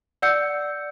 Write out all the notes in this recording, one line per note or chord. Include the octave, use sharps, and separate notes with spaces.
D5 F#5 E6 G6 C#7